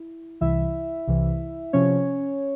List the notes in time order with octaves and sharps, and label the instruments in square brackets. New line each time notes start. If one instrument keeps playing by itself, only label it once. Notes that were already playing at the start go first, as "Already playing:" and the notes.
Already playing: [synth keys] E4
C2 C3 E3 E4 E5
C2 C3 E3
C3 F3 C#4 C#5